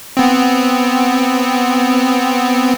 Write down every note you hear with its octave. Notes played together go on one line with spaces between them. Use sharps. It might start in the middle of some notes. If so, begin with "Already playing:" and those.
B3 C4